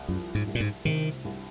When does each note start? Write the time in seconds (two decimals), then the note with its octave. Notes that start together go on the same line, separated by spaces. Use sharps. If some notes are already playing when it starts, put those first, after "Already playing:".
Already playing: C2
0.08 F#2 F3
0.35 G#2
0.47 C2
0.55 A#2
0.60 G#2
0.85 C3 D#3
1.25 C2